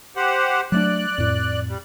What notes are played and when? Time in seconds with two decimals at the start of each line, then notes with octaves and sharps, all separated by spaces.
0.16 G4 C5 F#5
0.72 F#3 A3 D4 D5 F#6
1.18 F2 A2
1.68 G3